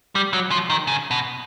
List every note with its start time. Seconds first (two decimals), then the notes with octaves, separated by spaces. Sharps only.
0.15 G3
0.33 F#3
0.51 F3
0.70 D#3
0.87 C#3
1.11 B2